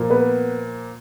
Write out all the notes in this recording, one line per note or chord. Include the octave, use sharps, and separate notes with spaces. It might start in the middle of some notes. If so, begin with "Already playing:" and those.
Already playing: A#2 F3 A#3
B3 B4